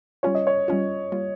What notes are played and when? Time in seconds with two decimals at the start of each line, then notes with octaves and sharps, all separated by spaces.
0.23 G3 C#4 F4 C#5
0.35 D#5
0.47 C#5
0.68 G3 C#4 F4
1.12 G3 A#3 F4